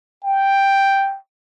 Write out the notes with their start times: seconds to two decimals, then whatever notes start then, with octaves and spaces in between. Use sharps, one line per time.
0.24 G5